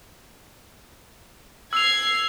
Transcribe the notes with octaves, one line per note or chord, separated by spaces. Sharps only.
E6 G#6 C7 F7